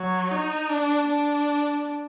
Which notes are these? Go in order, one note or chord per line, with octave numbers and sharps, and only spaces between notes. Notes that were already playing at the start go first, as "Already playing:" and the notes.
Already playing: F#3
D#4
D4
D4